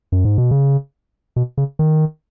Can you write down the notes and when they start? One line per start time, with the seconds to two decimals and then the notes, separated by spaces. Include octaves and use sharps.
0.12 F#2
0.25 G#2
0.38 B2
0.51 C#3
1.36 B2
1.58 C#3
1.79 D#3